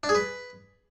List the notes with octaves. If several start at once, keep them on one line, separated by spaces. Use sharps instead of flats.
D4
G#4
B4